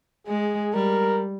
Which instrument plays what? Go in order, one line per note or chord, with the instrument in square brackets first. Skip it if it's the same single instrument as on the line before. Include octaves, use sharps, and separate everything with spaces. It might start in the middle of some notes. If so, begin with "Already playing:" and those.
[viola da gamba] G#3 [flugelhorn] G#4
[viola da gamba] G3 [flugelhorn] A#4